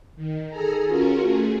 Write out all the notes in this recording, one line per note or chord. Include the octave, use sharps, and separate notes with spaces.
D#3
G#4 A4 G#5 A#5
C#4 F4 F#4 A#4
A3 G#4